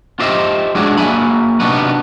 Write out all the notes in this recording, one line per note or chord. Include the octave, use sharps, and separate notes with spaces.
F4 G4 C5 D#5 E5
F#3 G#3 D4 E4 F#4 G#4
F#3 A#3 E5 G#5 B5
C3 B3 D4 D#4 F#4 B4